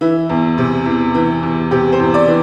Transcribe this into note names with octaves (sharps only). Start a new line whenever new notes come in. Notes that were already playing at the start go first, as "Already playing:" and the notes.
E3 E4
E2
C3
E2
E3
E2
C3 G4
C5
E2
D5
E3